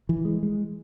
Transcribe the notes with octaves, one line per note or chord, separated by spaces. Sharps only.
E3
G#3
G#3